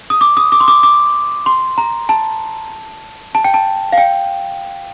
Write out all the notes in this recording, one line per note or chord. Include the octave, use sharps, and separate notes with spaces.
D#6
D6
D#6
D6
C6
D6
D6
C6
A#5
A5
A5
G5
A5
F5
G5